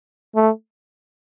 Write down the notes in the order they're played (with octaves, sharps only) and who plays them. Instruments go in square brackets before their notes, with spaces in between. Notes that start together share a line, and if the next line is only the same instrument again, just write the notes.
[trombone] A3